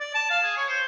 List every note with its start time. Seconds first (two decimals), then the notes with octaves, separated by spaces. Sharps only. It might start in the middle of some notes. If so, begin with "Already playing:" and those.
0.01 D5
0.15 A5
0.30 F5
0.43 G#4
0.57 C#5
0.69 C5